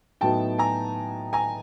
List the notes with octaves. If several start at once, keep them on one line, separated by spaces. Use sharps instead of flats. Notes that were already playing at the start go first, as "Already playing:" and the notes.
A2 F#3 B3 D#4 G5 A5
G#5 A#5
G#5 A#5